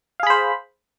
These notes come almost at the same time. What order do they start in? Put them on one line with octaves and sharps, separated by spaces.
F5 G#4 B5 C5